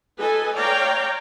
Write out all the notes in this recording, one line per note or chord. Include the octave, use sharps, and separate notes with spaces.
A4 B4 D#5 G#5
C#5 D5 F5 G5 A#5